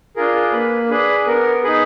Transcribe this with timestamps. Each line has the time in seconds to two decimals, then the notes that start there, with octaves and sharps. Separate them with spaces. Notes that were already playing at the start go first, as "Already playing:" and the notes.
0.16 D4 F4 G#4 A#4
0.53 A#3 B4
0.90 D4 G#4 B4
1.27 B3 A#4
1.63 D#4 G#4 B4